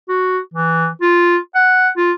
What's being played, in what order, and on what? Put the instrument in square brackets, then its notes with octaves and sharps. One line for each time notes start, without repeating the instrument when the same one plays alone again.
[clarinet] F#4
E3
F4
F#5
F4